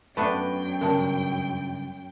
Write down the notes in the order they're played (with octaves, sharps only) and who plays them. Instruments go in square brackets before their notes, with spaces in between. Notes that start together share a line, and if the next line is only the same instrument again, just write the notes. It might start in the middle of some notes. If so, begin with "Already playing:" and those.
[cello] F#2 G5 [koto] A3 B3 D4 [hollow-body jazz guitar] B4
[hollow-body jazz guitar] G2 C#3 [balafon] A#4 A5